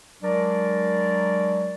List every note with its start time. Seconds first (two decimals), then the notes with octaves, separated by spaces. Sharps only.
0.23 F#3 G#3 D4 A#4 D5